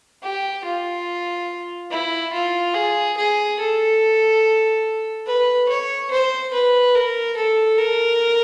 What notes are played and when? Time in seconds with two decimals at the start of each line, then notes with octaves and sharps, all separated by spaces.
0.23 G4
0.65 F4
1.91 E4
2.33 F4
2.74 G#4
3.17 G#4
3.59 A4
5.26 B4
5.69 C#5
6.11 C5
6.53 B4
6.94 A#4
7.37 A4
7.78 A#4